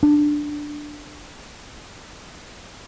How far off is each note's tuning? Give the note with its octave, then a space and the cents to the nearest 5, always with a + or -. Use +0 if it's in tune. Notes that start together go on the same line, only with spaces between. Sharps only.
D4 +10